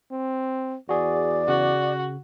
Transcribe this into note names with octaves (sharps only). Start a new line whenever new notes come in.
C4
E2 F#4 G#4 D5
C#3 F#4